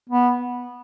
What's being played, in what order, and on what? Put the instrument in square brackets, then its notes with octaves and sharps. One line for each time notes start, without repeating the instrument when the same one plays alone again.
[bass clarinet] B3